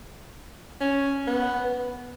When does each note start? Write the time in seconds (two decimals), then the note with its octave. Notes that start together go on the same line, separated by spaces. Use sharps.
0.80 C#4
1.27 B3